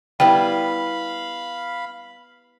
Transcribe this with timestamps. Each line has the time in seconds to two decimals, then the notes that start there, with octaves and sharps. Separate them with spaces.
0.20 G3 B3 E4 F5 G5 B5